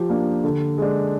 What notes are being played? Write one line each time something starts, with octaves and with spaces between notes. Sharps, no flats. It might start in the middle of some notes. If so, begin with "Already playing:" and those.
Already playing: F3 G4
A#3 D4
D3
G#3 D4